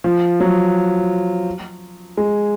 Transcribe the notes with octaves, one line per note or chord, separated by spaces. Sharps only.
F3
F#3
G#3